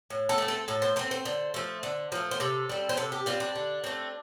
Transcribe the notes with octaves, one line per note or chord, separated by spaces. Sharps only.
A2
A4
A3 C4
A4
A2 A4
C5
A3 C4 C5
C5
D3
F3 A3
D3
F3 A3
C5
C3 A4
G3 C4
C5
C3 A4
G4
G3 C4 F4
D4
D3
A3 C4